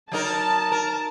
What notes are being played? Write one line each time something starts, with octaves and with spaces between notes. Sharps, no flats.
F#3 D#4 A#4 A5
A#4